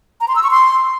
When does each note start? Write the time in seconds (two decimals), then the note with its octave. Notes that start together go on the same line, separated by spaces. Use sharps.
0.21 A#5
0.28 C6
0.36 E6
0.43 C#6
0.51 C6